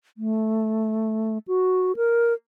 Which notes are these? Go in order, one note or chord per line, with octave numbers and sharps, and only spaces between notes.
A3
F#4
A#4